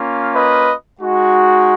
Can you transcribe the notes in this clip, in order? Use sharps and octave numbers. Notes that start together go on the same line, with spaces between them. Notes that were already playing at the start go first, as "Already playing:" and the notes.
Already playing: A#3 C#4 F4
B4 D#5
G#3 D#4 F#4